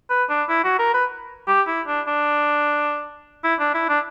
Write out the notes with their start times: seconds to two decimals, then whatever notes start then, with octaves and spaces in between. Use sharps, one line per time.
0.10 B4
0.29 D4
0.49 E4
0.64 F#4
0.79 A#4
0.94 B4
1.48 G4
1.67 E4
1.87 D4
2.07 D4
3.44 E4
3.59 D4
3.74 E4
3.89 D4